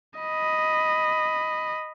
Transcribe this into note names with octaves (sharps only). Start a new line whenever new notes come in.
D#5 B5